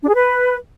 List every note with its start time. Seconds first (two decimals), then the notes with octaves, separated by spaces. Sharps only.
0.02 D4
0.08 G#4
0.14 B4